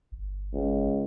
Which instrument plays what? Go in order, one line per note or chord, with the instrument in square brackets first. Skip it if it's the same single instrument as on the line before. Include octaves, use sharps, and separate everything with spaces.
[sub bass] G1
[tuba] C#2